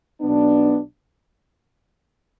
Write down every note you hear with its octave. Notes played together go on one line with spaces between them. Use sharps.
B1 B2 B3 D4